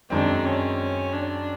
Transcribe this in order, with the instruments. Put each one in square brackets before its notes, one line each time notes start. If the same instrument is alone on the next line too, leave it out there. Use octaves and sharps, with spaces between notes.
[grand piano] F#2 D#3 G#3 C4 [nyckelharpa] D4
[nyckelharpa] C#4
D4